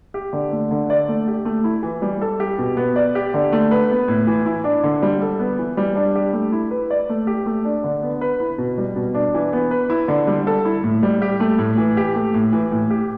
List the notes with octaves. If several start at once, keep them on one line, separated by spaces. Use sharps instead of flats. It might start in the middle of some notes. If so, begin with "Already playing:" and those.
G4
D3
A3
D3
D5
A3
G4
A3
E4
E3
G3
A4
G4
B2
B3
D5
G4
D3
A3
B4
B3
A2
E3
E4
D4
D3
G3
A4
B3
E3
G3
D4
G4
A3
E4
B4
D5
A3
G4
A3
D4
D3
B3
B4
E4
B2
G3
B2
D4
E3
B3
B4
E4
D3
G3
A4
E4
A2
G3
G4
A3
A2
E3
G4
A3
A2
E3
A2
G4